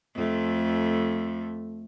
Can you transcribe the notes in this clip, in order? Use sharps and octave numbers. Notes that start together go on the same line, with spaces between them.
F2 A3